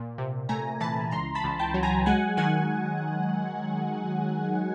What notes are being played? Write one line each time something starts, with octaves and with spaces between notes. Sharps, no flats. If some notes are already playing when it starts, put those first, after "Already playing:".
Already playing: A#2
C3
A3 G#5 A#5
E3 A5 B5
C#2 A#5 C6
A5 B5
C#2
G5 A5
F#3
G#5 A#5
G#3 F#5 G#5
D#3 F#5 G#5